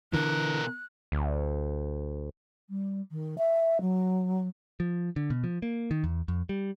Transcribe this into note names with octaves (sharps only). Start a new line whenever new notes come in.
B2 D3 E3 A#4 F#6
D2
G3
D#3
E5
F#3
F3
D3
B2
F3
A#3
D#3
E2
F2
G3